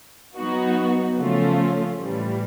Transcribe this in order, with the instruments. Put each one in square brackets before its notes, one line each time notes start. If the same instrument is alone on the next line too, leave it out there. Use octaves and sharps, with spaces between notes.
[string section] F#3 B3 D#4 F#4
C#3 F3 A3 C#4 F4
A2 E3 G3